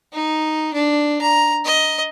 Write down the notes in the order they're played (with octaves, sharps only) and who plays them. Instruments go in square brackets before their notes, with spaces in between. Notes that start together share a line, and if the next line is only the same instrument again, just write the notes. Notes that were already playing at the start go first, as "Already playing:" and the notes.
[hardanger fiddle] D#4
D4
A#5
D#5